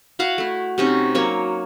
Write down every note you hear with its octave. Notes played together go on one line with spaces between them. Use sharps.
E4 F#4 F5 F#5
A3 E4
C3 C#4 D#4
F#3 A#3 C#5